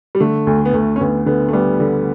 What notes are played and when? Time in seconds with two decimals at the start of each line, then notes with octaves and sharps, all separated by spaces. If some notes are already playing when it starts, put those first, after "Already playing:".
0.15 G3
0.20 D3 A3
0.47 D2
0.65 B3
0.73 D2 A3
0.96 C#4
1.00 D2 B3
1.26 D3 B3
1.48 A3
1.53 G3 B3
1.80 D3